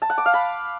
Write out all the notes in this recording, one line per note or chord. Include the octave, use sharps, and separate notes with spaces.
A5
F#5
D6
F5
B5